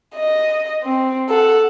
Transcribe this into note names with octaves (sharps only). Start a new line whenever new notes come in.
D#5
C4
A4 F#5